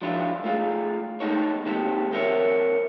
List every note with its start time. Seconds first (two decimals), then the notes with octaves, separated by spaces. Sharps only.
0.02 F3 F#3 D4 E4 F4
0.44 A3 F4 G#4
1.20 A3 B3 D#4 A4 C#5
1.66 D#3 A#3 C4 G4 A4
2.13 C4 A#4 C#5 E5